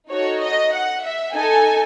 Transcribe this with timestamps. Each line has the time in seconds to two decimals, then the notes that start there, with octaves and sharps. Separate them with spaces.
0.11 D#4 F#4 A4 C#5
0.42 D#5
0.72 F#5
1.03 E5
1.34 D#4 A4 G#5